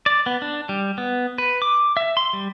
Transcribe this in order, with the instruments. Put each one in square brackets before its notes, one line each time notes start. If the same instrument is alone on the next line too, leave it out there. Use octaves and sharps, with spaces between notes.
[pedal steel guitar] D5
B3
D4
G3
B3
B4
D6
E5
C6
G3